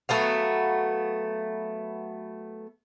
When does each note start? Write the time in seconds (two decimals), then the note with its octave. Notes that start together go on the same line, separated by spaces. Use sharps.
0.09 F#3 A3 B3 F5